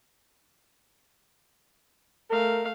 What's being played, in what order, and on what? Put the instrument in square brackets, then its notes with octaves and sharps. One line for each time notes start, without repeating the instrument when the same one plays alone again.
[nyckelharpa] A3 F5 [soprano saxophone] A#4